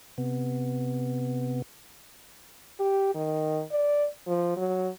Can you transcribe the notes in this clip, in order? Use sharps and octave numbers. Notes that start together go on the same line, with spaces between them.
C3 B3
G4
D#3
D5
F3
F#3